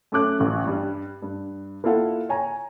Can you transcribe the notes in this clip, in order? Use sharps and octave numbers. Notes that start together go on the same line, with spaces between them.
F#2 A3 C#4 D6 F#6
A1
G2 G3
G2
A#3 E4 F4 A4 F5 F#5
C#5 G#5 A#5